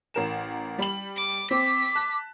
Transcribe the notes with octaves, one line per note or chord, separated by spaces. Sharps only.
A1 A#4 E7
G3 B5 F#7
D6
C4 D6 B6
A5 F#6